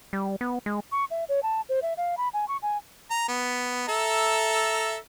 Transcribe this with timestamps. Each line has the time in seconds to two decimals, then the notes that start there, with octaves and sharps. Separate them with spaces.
0.13 G3
0.41 B3
0.66 G#3
0.92 C#6
1.11 E5
1.29 C#5
1.43 A5
1.69 C5
1.82 E5
1.97 F5
2.17 B5
2.33 G#5
2.48 C#6
2.62 G#5
3.11 A#5
3.28 B3
3.88 A4 E5 A#5